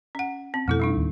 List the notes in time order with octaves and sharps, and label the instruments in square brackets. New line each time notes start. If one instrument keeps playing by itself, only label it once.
[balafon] C#4 F#5
C4
[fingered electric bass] F2 B2 [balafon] A3 E4 A4
[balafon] G3 D4 D#4
[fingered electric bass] D1 D#2